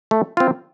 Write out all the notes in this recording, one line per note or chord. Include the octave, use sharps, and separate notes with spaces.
A3
C4 F4